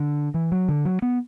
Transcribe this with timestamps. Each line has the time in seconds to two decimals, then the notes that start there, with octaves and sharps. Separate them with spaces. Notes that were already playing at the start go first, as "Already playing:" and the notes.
Already playing: D3
0.34 E3
0.52 F#3
0.69 D3
0.85 F#3
1.02 B3